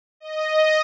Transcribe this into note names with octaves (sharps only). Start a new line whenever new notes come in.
D#5